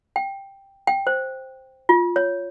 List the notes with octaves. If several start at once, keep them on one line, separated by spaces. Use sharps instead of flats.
G5
G5
C5
F4
C#5